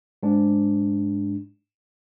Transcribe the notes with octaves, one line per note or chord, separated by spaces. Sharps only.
G#2 D4